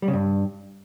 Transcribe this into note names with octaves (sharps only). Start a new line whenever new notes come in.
G3
C#3
G2